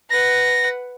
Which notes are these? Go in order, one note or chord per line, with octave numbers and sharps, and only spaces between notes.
B4 F#5 A#6